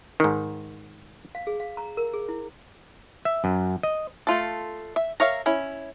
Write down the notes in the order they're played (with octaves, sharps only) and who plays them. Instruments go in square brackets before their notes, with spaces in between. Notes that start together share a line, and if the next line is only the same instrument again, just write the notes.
[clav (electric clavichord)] G#2 D#3
[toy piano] F5
G#4
F5
A#5
A#4
G#4
E4
[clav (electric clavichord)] E5
F#2
D#5
[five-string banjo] A3 F4 A4
E5
A#4 C#5 E5 F5
C#4 E4